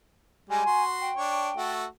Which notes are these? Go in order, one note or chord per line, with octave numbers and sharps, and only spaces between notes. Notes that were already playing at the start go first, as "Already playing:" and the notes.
G3 G#3 G4 G#5
F#4 C6
G5
D4 C#5
A3 F#4 A4